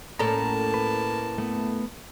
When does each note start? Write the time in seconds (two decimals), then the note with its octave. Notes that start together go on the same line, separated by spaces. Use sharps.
0.19 A2 A#3 C#4 A4 A5 A#5
0.74 B4
1.38 A3 B3